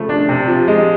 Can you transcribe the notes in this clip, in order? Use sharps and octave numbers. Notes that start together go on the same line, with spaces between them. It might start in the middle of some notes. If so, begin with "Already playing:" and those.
Already playing: C#3 F3 A3
D4
C3
F3
G#3